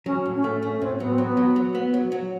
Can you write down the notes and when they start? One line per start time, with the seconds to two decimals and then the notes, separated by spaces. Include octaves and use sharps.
0.06 F#3 C#4
0.26 A2
0.35 C#4
0.44 A3
0.63 A3 C#4
0.81 A2 C4
0.99 F#3 B3
1.12 C4
1.18 F#3
1.24 B3
1.37 F#3
1.56 F#3
1.75 B3
1.94 F#3
2.12 F#3